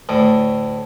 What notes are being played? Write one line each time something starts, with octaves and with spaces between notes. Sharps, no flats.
D2 A2